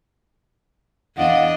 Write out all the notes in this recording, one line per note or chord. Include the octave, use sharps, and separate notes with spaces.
E2 D4 D#5 F5 F#5